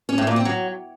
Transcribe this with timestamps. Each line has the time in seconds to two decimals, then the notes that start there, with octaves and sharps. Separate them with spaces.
0.09 C#4
0.18 A2
0.27 A#2
0.36 C4
0.45 F#3